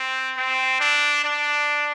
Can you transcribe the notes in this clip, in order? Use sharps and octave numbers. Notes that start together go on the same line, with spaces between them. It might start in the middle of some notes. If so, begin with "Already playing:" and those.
Already playing: C4
C4
D4
D4